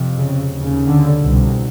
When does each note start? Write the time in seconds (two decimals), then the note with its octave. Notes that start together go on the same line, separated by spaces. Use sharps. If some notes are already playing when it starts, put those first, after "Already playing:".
Already playing: F2 C3
0.18 C#3
0.52 D#2 C#3
0.86 D3
1.20 C2 B2